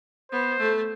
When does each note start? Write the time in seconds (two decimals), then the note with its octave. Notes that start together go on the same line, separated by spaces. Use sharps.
0.32 B3 C5
0.59 A3